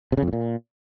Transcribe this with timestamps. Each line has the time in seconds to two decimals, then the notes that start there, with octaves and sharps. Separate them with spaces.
0.12 C3
0.17 C#3
0.23 F2
0.28 A2
0.33 A#2